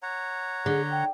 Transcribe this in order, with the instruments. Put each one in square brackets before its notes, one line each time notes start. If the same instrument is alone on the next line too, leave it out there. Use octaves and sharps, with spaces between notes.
[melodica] C#5 F#5 A#5
[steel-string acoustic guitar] D3 [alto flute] G#4
[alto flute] G5